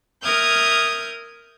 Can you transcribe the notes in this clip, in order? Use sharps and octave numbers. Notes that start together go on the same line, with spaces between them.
A#4 E5 D#6 F6 G6 G#6